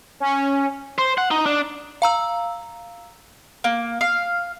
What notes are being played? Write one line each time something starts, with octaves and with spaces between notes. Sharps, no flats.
C#4
C5
F#5
D#4
D4
F5 A#5 E6
A#3
F5